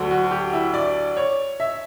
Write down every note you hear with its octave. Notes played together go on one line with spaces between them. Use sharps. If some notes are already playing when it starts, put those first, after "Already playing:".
Already playing: D2 D3 F#3
F#4
G4
E4
D5
C#5
E5